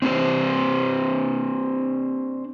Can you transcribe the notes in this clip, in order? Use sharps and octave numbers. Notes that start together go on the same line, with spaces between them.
C4 D4 G4 C5